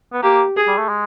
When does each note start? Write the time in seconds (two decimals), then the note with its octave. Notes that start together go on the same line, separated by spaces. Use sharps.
0.13 B3
0.23 A#3 G4
0.57 G#4
0.68 G3
0.78 A3
0.89 G#3